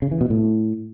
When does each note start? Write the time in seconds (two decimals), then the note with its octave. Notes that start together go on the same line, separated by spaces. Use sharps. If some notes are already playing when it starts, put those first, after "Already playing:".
0.02 C#3
0.11 E3
0.21 B2
0.30 A2